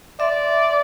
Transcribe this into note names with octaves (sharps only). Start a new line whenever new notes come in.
D5 E5 C6